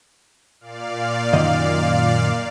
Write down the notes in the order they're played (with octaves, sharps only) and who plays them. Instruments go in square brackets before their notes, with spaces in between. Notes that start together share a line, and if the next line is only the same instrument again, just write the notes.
[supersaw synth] A#2 D5 F5
[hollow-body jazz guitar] F#2 D#3 D#5